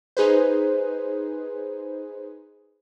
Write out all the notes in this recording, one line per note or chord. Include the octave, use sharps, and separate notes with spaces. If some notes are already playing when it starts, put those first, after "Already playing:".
D#4 G#4 B4 C5